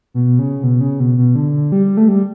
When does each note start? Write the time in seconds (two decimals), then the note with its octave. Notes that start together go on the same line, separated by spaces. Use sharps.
0.14 B2
0.39 C#3
0.63 B2
0.81 C#3
1.00 B2
1.17 B2
1.36 D3
1.72 G3
1.97 A3
2.08 G3